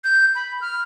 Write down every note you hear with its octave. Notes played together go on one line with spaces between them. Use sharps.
G6
B5
F6